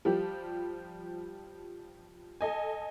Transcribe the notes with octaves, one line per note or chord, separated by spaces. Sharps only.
F3 G3 G4
A4 D#5 G#5